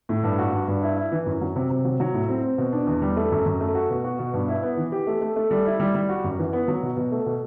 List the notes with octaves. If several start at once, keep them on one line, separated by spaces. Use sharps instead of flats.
A2
G2
F#4
G2
G2
E4
E4
E3
F#2
F#3
C3
C3
F#3
F#3
A2
C4
C4
B2
D4
E2
G3
A3
F#2
F#2
A3
F#4
B2
F#4
B2
G2
E4
B3
E3
G4
A3
A3
A3
G3
E4
G3
G3
F#4
F#2
E3
B3
F#3
B2
B2
A3
B2